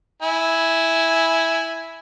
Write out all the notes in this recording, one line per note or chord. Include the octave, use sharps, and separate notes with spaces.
E4 G#5